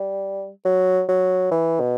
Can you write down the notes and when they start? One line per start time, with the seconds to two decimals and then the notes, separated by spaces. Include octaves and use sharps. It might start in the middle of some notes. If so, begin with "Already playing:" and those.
Already playing: G3
0.65 F#3
1.09 F#3
1.51 E3
1.80 B2